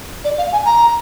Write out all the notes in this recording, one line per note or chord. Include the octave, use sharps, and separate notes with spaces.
D5
F5
G#5
A#5